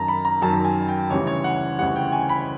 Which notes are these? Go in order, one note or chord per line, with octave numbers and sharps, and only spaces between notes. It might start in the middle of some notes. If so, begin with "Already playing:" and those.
Already playing: F#2 D#3 F#3 A5 A#5
B5
A#5
F#2 D#3 F#3 A5
G#5
G5
D2 C#3 E3 G3 C#5
C#5
F#5
D2 C#3 E3 G3 F#5
G5
G#5
B5